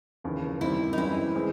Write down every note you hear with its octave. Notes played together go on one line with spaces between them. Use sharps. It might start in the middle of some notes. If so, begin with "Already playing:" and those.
F1 D#2 C#3 E3
D#2 D#3 G3 C4 E4
D#4
F#2 C#3 E3 G3 C4 E4
E3 G#3 C4